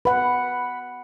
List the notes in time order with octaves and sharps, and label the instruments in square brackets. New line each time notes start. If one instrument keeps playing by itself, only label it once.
[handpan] B4 F#5 [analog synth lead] B5